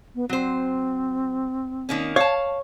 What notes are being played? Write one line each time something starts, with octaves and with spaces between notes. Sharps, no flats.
B3
F#3 C4 C5
D#3 A#3 C#4
C#5 F5 A5